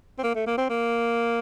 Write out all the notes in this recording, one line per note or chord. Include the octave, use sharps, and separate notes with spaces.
C4
A#3
A3
A#3
C4
A#3